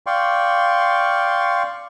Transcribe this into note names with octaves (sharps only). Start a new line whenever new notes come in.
D5 F5 G5 C6 C#6